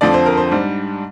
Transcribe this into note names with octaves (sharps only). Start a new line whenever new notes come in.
F2 D3 F3 C4 D5
C5
A#4
C5
G#2 G3 D4